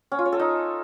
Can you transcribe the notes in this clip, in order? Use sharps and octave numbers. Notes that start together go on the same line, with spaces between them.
C#4
F4
C#5
A4
D#4